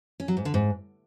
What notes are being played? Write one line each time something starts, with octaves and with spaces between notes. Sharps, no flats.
C#4
F#3
G#2
D3
G#2